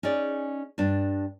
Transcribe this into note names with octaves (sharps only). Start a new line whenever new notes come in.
C#4 D#4 G#4 D5
G2 D4